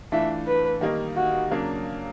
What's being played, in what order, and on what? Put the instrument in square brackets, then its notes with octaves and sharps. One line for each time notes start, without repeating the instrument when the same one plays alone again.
[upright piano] E3 A3 D4 F4 [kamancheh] E5
[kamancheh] B4
[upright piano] D#3 G3 A#3 D#4
[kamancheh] F#4
[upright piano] C#3 F#3 A#3 D4